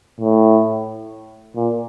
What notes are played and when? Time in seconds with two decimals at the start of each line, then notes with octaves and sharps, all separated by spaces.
0.20 A2
1.56 A#2